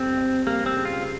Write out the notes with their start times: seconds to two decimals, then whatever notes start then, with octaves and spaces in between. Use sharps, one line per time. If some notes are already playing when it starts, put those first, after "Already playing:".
Already playing: F2 G3 C4
0.17 F2
0.46 G3 A#3
0.66 C4
0.76 C#3
0.85 F4